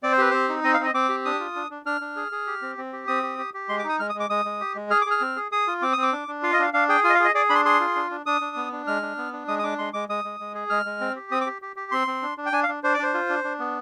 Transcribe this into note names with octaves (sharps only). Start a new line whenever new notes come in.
C4 D5
C5
G4 B4
C4 C5
D#4
C4 D#5
F5
C4 D#5
C4 D6
G4
D4 D#6
F4
D4
D4
D4 F6
D4
G#4
G#4
G4
C4
C4
G4
C4 D#6
G4
G4
G4
G#3 C6
D6
D#4 D#6
G#3 F6
D#6
G#3
D6
G#3 D#6
G#3
G4
G#3
G#4 F6
D6
G#4 F6
C4
G#4
G#4 D#6
F4
C4 D6
C4 D#6
D6
D4
D4
F4 F5
D#5
D4 F5
D4 F5
G#4 G5
F4 G#5
D#5
F5
G#4
D#5
G#4 D5
D4 B5
C6
G#4 C6
F4
D4
D4
D4 D#6
D4
B3
D4
G#3 F6
D4
B3
D4
G#3 D#6
D#6
D4 D6
G#3 C6
G#3 D6
G#3 D#6
G#3
G#3
G#4
G#3 F6
G#3
C4
G4
C4 D#6
D6
G4
G4
G4
C4 C6
C4
D4
D4
G5
D4 G#5
F5
D4
D4 C5
D5
D4 C5
F4
D4
D4
B3